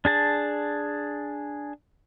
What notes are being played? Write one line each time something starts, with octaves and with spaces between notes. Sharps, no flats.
D4 G#4 A5